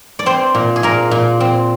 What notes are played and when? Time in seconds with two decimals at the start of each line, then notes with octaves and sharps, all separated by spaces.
0.19 D5
0.26 C4 C5
0.55 A#2
0.76 G#4
0.83 A#2 A#4
1.11 A#2
1.40 C4